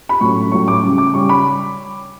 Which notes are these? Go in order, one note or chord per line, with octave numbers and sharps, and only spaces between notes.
B5
A2 F#3 A3 C#4 C#6
A2 F#3 A3 C#4 C#6
D6
C#3 G3 C#4
D6
C#3 G3 C#4 C#6
B5